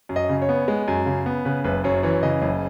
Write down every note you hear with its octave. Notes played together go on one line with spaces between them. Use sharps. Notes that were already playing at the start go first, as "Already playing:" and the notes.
F#2
D#5
C#3
C#5
B3
G#3
F#2
C#3
B3
C#3 B4
F#1 B4
F#2 C#5
E3 C#5
C#3 D#5
F#1